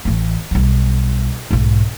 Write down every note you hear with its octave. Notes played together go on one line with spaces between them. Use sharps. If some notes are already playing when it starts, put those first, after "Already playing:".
A1 E3
B1 G3
B1 G#2